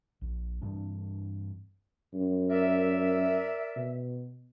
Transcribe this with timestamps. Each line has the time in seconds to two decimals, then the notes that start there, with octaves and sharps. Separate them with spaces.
0.21 A#1
0.61 G2 E3 C4 D4
2.13 F#2
2.50 A#4 D5 E5
3.76 B2